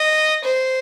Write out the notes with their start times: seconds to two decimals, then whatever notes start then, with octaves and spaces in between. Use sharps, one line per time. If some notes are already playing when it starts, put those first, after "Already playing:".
Already playing: D#5
0.44 C5